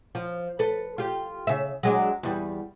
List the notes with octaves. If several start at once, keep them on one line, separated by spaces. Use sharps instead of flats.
F3
A4 B4
F4 G4
C#3 E5
F#3 G#3 D4
E2 G3